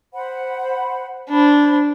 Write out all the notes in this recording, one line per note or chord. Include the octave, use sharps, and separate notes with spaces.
C5 F#5 B5
D4 C5 B5